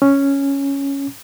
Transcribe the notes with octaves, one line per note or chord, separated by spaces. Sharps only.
C#4